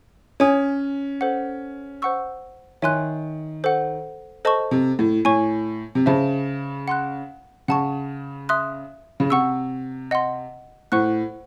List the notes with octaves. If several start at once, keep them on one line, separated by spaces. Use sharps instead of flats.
C#4 C#5 G#5 D#6
A4 C5 F#5
C5 F#5 C#6 E6
D#3 C#5 E5 G#5 C6 F#6
A4 C5 F#5
A4 C5 D#5 A5 C#6
C3
A2
A2 C#5 G#5 C#6
C3
C#3 C5 E5 A5
F#5 C6 F#6
C#3 F#5 A5 C#6
E5 C6 D#6 F#6
C#3
C3 F#5 C#6 E6
D#5 F#5 C6
A2 C5 F#5 C#6 F#6